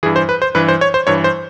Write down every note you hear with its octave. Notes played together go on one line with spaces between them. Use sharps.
G2 E3 G#4
C5
B4
C5
G2 E3 B4
C5
C#5
C5
G2 E3 C#5
C5